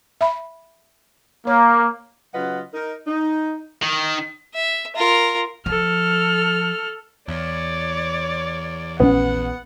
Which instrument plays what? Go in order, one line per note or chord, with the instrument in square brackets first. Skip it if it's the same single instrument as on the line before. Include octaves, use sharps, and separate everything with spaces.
[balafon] E5 B5
[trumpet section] A#3 [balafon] C#5
[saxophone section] C#3 F#3 F4 B4 D#5 F#5
D#4 A#4
D#4
[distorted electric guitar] D#3
[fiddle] E5
F4 A#4
[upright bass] F3 [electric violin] A4 F6
[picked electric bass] E2 [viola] C#5 D5
[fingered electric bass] A#1 D3 C#4 [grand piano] B3 [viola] F#5